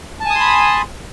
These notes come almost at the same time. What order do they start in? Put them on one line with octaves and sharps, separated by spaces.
A5 G#5 D#6 C6 B5